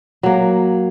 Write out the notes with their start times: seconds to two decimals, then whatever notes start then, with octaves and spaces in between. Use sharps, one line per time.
0.23 F#3 A#3